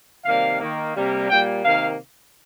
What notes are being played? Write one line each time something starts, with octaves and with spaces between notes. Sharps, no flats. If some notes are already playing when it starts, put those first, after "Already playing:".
C3 D#3 G3 A#3 F5
D#3 A#3
C3 G3 A#3
A#2 G3 A#3 G5
C3 D#3 A#3 F5